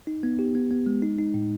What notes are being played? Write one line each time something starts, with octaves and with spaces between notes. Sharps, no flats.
D#4
B3
G4
B3
B3
G#3
D#4
D#4
A2